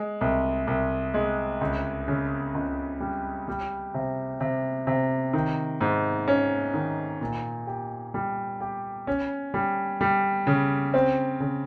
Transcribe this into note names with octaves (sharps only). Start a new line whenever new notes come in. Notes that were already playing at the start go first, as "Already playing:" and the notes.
Already playing: G#3
C2
C2
G#3
C#2
C#3
C#2
G3
G3
C3
C3
C3
D#3
G#2
C#4
D#3
A#2
G4
G3
G4
C#4
G3
G3
C#3
C4
C#3